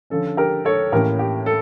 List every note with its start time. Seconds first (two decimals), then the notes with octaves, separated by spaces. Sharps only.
0.10 D3 F3 C#4 A4
0.37 G4 A#4
0.65 A4 C#5
0.92 A2 E3 A#3 C#4 G4 A#4
1.19 G4
1.46 A4